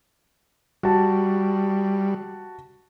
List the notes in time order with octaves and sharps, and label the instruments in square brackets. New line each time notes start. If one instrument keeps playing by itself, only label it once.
[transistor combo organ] G3 [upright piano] F#4 A5